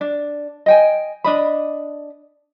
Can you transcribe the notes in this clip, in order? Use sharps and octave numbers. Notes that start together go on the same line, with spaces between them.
D4
D#5 G5 G#5
D4 D#5 B5